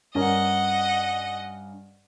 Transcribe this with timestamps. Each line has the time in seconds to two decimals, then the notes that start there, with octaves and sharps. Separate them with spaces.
0.15 G2 C#4 A#4 D#5 F#5